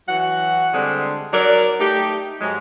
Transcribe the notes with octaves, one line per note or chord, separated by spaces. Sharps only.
E3 F#3 F#4 F#5
D3 G3 G#3 C4 D4
F#3 D#4 A#4 D5
A3 D#4 G4
G#2 F#3 G#3